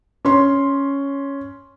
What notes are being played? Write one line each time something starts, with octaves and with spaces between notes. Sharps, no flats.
C#4 C6